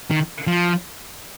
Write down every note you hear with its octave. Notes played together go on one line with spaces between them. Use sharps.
D#3
F3